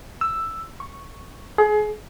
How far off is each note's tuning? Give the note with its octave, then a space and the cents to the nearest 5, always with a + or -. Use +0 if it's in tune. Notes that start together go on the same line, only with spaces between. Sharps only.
E6 +5
C#6 -5
G#4 +30